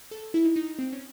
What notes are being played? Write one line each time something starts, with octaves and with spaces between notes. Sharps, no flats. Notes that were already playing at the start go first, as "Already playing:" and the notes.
A4
E4
D#4
D#4
C4
C#4